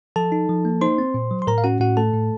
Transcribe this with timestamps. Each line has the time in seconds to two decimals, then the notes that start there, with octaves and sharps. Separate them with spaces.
0.16 F3 A4 A5
0.32 D#4
0.49 F3
0.65 A#3
0.81 D#4 C5 C6
0.98 C4
1.14 A#2
1.31 F#3
1.42 C6
1.47 A2 A#4 A#5
1.58 F5
1.64 C#4 F#4 F#5
1.80 A2 F#4 F#5
1.97 A3 A4 A5
2.13 A2